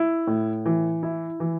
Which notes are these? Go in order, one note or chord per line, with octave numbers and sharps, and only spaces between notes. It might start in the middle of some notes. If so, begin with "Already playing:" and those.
Already playing: E4
A2
E3
E4
E3